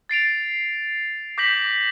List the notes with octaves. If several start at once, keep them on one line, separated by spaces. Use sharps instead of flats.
A6 C7 D7 F7
D6 G6 A#6 B6 F#7